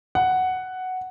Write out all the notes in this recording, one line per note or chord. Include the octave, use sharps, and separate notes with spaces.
F#5